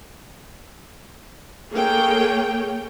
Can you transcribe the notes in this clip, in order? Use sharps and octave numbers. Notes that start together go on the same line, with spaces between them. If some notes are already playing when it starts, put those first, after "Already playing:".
A#3 G#4 A4 C#5 G5